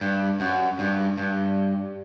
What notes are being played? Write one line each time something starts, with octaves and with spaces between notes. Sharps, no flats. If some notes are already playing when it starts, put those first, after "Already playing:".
G2
F#2
G2
G2